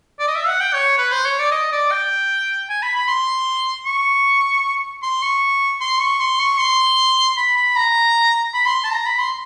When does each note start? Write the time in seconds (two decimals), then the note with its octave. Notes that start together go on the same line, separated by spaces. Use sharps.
0.20 D5
0.28 D#5
0.35 E5
0.48 F#5
0.60 G5
0.73 C#5
0.98 B4
1.12 C5
1.25 C#5
1.39 D5
1.51 D#5
1.72 D5
1.91 G5
2.70 G#5
2.83 B5
2.96 B5
3.08 C6
3.86 C#6
5.02 C6
5.22 C#6
5.81 C6
6.00 C#6
6.20 C6
6.39 C#6
6.59 C6
7.37 B5
7.57 B5
7.76 A#5
8.54 B5
8.67 C6
8.84 A5
8.93 A#5
9.06 B5
9.19 C6